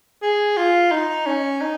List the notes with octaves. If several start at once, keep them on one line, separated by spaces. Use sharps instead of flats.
G#4
F4
D#4
C#4
D#4